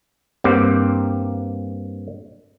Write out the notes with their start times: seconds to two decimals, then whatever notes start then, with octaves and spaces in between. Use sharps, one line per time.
0.44 G2 A#3 C4 G4